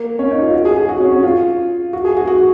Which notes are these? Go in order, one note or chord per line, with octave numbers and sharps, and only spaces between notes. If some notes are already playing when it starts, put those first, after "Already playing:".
Already playing: A#3
C#4
D#4
F4
F#4
G#4
G#4
F#4
C#4
C#4
F4
F#4
G#4
F#4
F#4